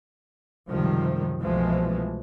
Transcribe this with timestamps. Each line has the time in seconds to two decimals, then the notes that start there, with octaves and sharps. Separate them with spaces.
0.69 C#2 F#2 C3 D#3 F3 G3
1.41 C2 B2 E3 F3 G#3 A3